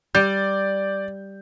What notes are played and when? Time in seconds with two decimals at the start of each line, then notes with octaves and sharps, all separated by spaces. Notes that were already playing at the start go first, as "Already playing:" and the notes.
0.15 G3 D5 G6